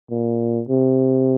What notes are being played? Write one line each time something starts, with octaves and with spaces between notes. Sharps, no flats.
A#2
C3